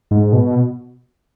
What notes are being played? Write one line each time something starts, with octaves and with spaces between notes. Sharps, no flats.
G#2
B2